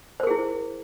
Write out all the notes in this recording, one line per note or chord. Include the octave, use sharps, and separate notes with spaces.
E4 G#4 A#4 C5